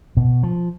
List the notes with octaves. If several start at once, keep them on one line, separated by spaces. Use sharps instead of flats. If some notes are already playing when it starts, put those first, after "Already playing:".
B2
F3